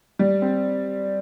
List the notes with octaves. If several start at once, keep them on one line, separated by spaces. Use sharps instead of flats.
G3
C4